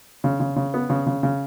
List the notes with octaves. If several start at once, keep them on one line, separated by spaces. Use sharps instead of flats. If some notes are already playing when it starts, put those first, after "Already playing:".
C#3
C#3
C#3
B3
C#3
C#3
C#3